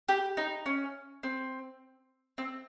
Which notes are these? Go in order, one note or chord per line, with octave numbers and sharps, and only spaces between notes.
G4
D#4
C#4
C4
C4